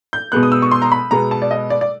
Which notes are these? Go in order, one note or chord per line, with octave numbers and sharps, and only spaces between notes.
G6
B2 G#3 B3 F#6
D#6
E6
C#6
C6
A#5
B5
B2 G#3 B3 A#5
A5
D5
D#5
D5
D5